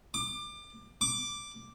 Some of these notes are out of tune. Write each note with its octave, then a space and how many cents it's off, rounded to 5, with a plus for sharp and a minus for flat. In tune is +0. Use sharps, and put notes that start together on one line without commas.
D6 +25
D6 +0